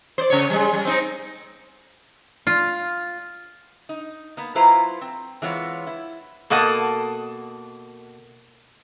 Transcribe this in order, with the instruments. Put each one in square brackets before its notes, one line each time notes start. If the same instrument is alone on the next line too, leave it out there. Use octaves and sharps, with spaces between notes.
[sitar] C5 D5
C#3 C#5
G3 G#3
G3
C4 D#4
[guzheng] F4
[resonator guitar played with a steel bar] D#4
A#3 B3
F#3 E4 F4 B4 C5 A#5
C4
E3 G#3 B3 C4 F4 C#5
E4
B2 A#3 A4 D#5 F#5 A5